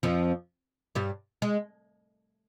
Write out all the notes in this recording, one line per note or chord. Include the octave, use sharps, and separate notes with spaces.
F2 F3
G2 G3
G#3